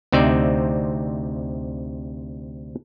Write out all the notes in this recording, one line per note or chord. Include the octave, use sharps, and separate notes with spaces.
D2 C3 C4 D#4 D5 E5